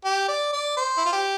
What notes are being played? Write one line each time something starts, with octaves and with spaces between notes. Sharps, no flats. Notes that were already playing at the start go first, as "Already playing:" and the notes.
G4
D5
D5
C5
E4
F4
G4